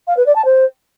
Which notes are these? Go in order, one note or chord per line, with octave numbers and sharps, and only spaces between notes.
F5
B4
D5
A5
C5